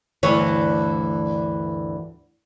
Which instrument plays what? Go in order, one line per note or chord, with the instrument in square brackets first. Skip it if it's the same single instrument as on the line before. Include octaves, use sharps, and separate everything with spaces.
[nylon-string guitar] D2 G2 E3 C#5